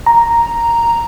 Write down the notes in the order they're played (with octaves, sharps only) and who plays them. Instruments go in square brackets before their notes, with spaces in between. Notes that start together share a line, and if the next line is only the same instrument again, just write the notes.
[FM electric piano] A#5